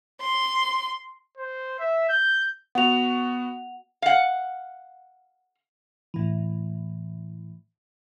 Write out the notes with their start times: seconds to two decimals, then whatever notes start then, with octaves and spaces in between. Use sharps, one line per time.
0.21 C6
1.38 C5
1.79 E5
2.09 G6
2.75 B3 F#4 F#5 F7
4.02 F5 F#5
6.14 A2 E3